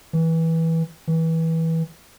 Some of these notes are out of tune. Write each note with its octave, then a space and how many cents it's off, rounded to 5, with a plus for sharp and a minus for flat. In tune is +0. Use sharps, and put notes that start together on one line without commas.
E3 -15
E3 -20